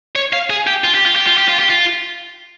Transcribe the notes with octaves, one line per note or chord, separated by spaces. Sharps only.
C#5
F5
G#4
G4
F4
G4
F4
G4
F4
G4
F4
G4
F4